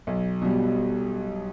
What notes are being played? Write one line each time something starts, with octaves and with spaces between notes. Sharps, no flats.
B1
B2 G3